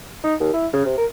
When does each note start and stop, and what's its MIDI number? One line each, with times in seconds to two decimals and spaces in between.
0.24 0.35 63
0.40 0.53 39
0.54 0.67 64
0.73 0.83 49
0.85 0.93 48
0.98 1.05 70